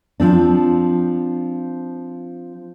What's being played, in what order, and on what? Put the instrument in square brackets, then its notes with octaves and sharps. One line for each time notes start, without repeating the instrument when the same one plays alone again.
[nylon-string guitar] F3 C4 D4